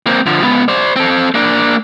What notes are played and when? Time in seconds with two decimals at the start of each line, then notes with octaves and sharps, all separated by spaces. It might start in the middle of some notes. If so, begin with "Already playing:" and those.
0.07 A#3 C4
0.26 D3 F3
0.42 C#2 B3
0.68 C5 D5
0.96 C4 A4
1.35 A#3 D4